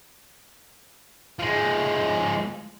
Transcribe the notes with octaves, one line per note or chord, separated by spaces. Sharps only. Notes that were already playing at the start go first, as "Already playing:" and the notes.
F3 G#3